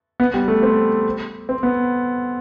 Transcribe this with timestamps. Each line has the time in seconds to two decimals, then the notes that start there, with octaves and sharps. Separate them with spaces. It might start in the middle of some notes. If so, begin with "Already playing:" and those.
0.20 B3
0.34 G3
0.48 A3
0.63 C4
1.49 C4
1.63 B3